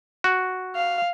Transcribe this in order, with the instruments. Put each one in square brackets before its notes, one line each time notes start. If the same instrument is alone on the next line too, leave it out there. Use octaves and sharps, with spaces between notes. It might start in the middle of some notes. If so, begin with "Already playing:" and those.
[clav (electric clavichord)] F#4
[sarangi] F5